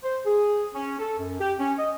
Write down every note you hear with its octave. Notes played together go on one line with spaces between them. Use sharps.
C5
G#4
C#4
A4
F#2
G4
C#4
D#5